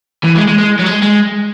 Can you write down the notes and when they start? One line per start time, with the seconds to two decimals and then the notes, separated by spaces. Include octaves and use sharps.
0.23 E3
0.35 G#3
0.48 G#3
0.59 G#3
0.79 F#3
0.86 G#3
1.03 G#3